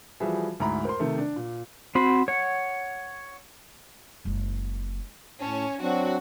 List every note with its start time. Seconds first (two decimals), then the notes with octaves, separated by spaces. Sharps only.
0.20 E3 F3 G3 F#4 G#4 E5
0.60 D2 G#2 E4 A#5 B5
0.85 A#4 C5 C6
0.99 C3 D#3 A3
1.18 D4
1.36 A#2
1.95 C4 F#4 C5 B5
2.28 C#5 F#5
4.25 F#1 G#3
5.41 A2 C#4 A5
5.81 F#3 C4 D4 F#4